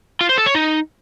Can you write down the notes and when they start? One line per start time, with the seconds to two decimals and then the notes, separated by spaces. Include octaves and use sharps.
0.21 F4
0.29 C5
0.38 A4
0.46 C#5
0.55 D#4